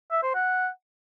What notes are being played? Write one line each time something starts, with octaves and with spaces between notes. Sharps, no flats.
E5
C5
F#5